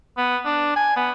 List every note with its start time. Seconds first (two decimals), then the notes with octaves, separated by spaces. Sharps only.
0.17 B3
0.45 D4
0.76 G#5
0.96 B3